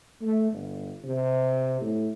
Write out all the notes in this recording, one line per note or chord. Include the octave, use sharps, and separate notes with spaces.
A3
G1
C3
A2